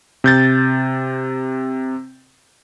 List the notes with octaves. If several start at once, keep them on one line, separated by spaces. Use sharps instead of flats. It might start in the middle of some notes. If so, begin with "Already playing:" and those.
C3 G6 A6